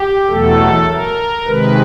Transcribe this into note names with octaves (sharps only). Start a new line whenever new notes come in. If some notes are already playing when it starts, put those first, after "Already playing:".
Already playing: G4
E2 B2 F#3 A3 A4
A#4
C3 D#3 G#3 B4